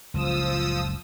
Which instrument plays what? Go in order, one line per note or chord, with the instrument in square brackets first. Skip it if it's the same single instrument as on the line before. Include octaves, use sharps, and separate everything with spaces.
[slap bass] F#1 C#2 F#2 [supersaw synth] F3 D#6 E6